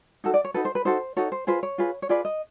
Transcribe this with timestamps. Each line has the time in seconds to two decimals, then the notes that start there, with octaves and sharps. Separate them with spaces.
0.24 D#4 F#4 A4
0.34 D5
0.44 C#5
0.54 D#4 F#4 A4 B4
0.65 C5
0.75 B4
0.85 D#4 F#4 A4 C5
1.17 D#4 F#4 A4 C#5
1.32 C5
1.47 F4 G#4 B4 C5
1.63 C#5
1.78 F4 G#4 B4
2.02 C#5
2.09 F4 G#4 B4 D5
2.25 D#5